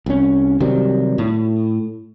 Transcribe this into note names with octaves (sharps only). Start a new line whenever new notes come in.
C2 C#4
C3 D#3 F#3 G3
A2